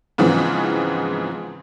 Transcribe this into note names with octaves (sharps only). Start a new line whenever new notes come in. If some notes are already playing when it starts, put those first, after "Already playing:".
G#2 C#3 E3 F3 B3 C4